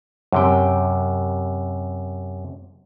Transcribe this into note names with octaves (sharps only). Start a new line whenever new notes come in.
F#2 C3 G5